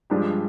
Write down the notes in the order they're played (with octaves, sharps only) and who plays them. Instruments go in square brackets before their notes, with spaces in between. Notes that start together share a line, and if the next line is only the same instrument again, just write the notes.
[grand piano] G2 F3 G#3 D4 G4